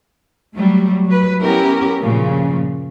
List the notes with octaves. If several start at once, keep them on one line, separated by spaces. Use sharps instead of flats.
F#3 G3 A3
F#3 B4
B3 C#4 E4 G4 A#4
G2 A#2 C#3 F3